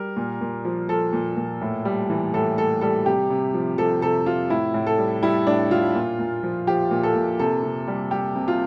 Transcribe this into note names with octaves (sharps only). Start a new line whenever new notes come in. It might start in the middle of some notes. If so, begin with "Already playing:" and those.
Already playing: G3 A#4
A#2
A#2
F3
F3 A4
A#2
A#2
A2
G3
E3
A2 A4
A2 A4
G3 A4
C3 G4
C3
F3
F3 A4
C3 A4
C3 F4
A2 E4
A2
A4
G3
G3 E4
A2 D4
A2 F4
A#2
A#2
F3
F3 G4
A#2
A4
A#2
C3 A4
C3
G3
G3 G4
C3
F4